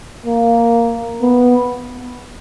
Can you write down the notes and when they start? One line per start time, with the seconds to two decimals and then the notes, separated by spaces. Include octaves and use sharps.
0.26 A#3
1.21 B3